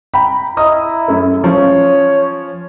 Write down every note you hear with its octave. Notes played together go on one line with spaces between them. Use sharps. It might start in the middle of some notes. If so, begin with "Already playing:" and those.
G5 A#5 B5
E4 D#5 A#5 D#6
F#2 A3
F3 C#4 F4 C#5